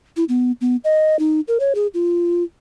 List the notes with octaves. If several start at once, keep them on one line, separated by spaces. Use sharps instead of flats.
E4
B3
B3
D#5
D#4
A#4
C#5
G#4
F4